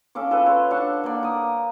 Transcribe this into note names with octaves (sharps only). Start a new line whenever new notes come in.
C#4 A4 F5 D6
F4 A4 B4 E5
C#5 A5 C6
D4 F#5 A5 C#6
A#3 D5
D6 D#6